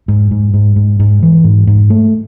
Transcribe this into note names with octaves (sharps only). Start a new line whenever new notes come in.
G#2
G#2
G#2
G#2
G#2
E3
G#2
G#2
A3